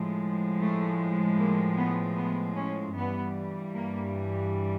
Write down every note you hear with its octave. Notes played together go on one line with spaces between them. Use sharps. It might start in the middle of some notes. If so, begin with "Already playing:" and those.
Already playing: A2 F3 G#3
A3
A#3
B3
B3
C#4
G2 E3 G3 B3
A#3